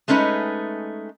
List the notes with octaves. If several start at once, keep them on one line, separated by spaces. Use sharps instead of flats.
G#3 A3 C#4 D#4 B4